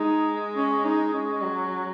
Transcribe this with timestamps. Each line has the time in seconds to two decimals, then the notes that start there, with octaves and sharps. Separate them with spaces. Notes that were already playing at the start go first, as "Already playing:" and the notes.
Already playing: G#3 D#4
0.56 C#4
0.85 D#4
1.13 C#4
1.42 F#3